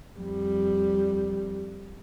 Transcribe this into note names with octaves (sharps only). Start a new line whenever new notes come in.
F2 G3